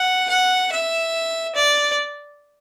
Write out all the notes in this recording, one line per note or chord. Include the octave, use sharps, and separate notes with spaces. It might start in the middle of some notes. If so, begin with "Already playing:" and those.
Already playing: F#5
F#5
E5
D5